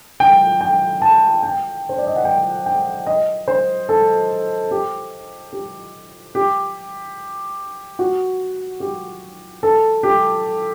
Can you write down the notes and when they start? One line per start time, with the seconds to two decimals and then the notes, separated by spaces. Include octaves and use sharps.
0.20 G5
0.61 G5
1.02 A5
1.43 G5
1.89 C5
1.98 D5
2.07 D#5
2.16 F#5
2.25 G5
2.66 G5
3.07 D#5
3.48 C5
3.89 A4
4.71 G4
5.53 G4
6.35 G4
7.99 F#4
8.80 G4
9.63 A4
10.03 G4